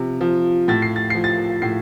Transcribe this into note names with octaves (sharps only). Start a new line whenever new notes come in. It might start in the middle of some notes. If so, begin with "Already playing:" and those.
Already playing: C3 F3
F3
A2 A6
C7
A6
F3 C7
A6
A2 C7